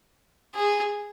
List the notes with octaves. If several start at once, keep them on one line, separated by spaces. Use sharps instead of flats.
G#4